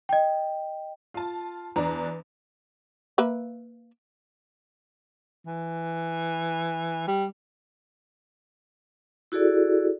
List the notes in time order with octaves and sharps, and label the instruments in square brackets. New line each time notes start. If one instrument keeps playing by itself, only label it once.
[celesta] D#5 G5
[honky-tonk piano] F4 A5
E2 D4 A#5
[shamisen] A#3 B4 E5
[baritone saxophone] E3
G3
[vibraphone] E4 F#4 G#4 A4 D5